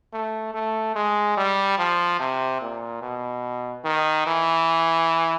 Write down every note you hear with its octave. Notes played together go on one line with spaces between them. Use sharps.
A3
A3
G#3
G3
F3
C3
A#2
B2
D#3
E3